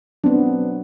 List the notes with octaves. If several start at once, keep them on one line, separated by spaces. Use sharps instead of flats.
F#3 B3 C4 D4